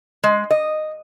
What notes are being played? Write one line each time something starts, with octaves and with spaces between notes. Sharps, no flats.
G#3
D#5